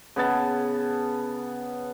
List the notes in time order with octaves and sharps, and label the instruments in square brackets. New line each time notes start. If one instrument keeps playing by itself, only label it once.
[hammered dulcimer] C#3 B3 A5